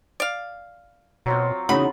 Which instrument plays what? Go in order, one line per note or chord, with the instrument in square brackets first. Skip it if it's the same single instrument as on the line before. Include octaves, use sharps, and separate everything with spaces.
[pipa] D5 F5
[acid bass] B2 [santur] F#3 C4 F4
[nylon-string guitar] E2 C#3 F#4 [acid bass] D#4 [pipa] B5